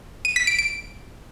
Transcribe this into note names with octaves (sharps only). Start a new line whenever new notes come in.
D#7
B6
D7
D7